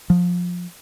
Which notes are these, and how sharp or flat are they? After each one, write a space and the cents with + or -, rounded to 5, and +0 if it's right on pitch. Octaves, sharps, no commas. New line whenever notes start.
F3 +20